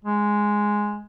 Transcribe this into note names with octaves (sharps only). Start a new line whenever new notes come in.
G#3